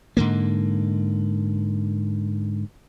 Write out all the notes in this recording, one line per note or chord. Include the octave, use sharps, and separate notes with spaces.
G#2 D3 A#3